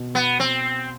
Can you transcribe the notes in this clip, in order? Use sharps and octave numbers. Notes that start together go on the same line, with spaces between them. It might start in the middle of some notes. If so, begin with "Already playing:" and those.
Already playing: B2
B3
C4